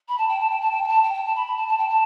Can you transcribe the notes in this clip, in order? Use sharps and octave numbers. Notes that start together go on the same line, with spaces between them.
B5
A5
G5
A5
G5
A5
G5
G5
A5
G5
G5
A5
B5
B5
A5
A5
G5
A5